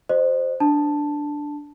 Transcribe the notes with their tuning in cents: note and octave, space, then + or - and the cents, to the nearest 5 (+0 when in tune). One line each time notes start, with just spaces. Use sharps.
G4 -45 C5 +0 D#5 -35
D4 +0 A5 +0